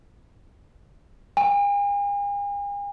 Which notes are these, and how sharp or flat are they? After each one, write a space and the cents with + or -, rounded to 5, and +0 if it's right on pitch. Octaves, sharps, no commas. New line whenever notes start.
G#5 -45